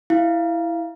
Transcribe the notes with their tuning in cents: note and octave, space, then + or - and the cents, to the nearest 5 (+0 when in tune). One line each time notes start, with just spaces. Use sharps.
E4 +0 F5 -15